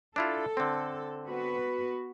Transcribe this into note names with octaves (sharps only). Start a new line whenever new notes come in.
D4 E4 F4 A4
D3 C4
B3 F#4 B4